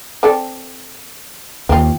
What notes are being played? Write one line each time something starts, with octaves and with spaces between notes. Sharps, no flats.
C4 A4 D5
D#2 C4 F4